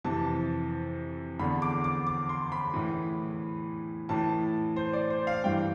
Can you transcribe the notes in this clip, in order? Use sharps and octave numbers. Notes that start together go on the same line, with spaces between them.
F2 C3 E3 A5
E2 D3 B5
D6
D6
D6
C6
B5
A2 E3
A2 E3 A5
C5
D5
C5
F5
G2 E3 G5